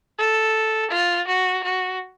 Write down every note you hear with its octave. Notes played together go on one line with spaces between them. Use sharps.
A4
F4
F#4
F#4